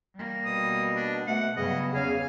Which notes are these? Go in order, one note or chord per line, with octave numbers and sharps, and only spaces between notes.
G3 A#3
B2 D#6
D4
B2 A3 F#5
G2 C#3 F#3 B3 D#5
E2 C#3 F5 G#5